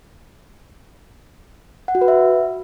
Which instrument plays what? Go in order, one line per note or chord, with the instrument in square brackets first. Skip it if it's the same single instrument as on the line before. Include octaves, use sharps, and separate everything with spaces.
[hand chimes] F#5
F#4
B4
E5